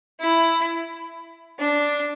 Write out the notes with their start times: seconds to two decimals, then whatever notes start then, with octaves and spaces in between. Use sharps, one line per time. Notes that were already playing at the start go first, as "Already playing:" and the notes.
0.20 E4
1.59 D4